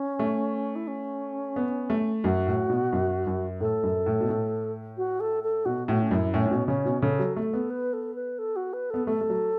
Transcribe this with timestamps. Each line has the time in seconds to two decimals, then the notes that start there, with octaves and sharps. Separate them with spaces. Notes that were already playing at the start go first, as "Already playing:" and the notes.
Already playing: C#4
0.19 A3
0.75 E4
0.87 C#4
1.56 B3
1.90 A3
2.24 F#2 F#4
2.47 A2
2.70 B2
2.92 F#2
3.27 F#2
3.61 A2 A4
3.83 F#2
4.06 A2
4.20 B2
4.29 A2
4.97 F#4
5.20 A4
5.43 A4
5.65 B2 F#4
5.88 A2 F#4
6.02 C#4
6.11 F#2 E4
6.34 A2 C#4
6.46 A2
6.51 B2
6.68 C#3 C#4
6.85 B2
7.02 C#3 A4
7.19 F#3
7.36 A3 A4
7.53 B3
7.70 B4
7.93 A4
8.15 B4
8.39 A4
8.56 F#4
8.73 B4
8.90 B3 A4
9.07 A3 A4
9.21 A3
9.30 F#3